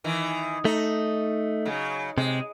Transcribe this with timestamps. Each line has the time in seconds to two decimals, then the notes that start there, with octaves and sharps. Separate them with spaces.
0.04 D#3 E3
0.65 A3 D#4
1.65 C#3 F#3
2.18 C3 G#3